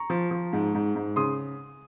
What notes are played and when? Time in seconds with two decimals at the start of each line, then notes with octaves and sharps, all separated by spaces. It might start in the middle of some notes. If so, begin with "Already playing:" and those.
Already playing: A#5 C#6
0.10 F3
0.31 F3
0.53 G#2
0.74 G#2
0.95 G#2
1.16 C#3 C6 D#6